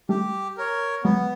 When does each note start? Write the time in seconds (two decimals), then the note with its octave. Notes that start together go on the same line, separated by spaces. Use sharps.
0.09 G3 A3 G4
0.57 A#4 C#5
1.04 F#3 G#3 B3